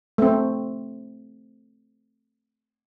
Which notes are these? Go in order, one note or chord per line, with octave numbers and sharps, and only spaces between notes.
A3 C4